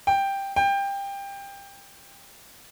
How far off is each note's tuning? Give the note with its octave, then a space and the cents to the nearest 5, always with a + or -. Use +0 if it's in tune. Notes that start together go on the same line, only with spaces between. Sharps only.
G5 +5
G5 +20